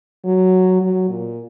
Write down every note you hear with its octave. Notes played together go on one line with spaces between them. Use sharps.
F#3
F#3
A#2